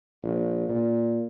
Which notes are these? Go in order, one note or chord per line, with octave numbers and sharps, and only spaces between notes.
A#1
A#2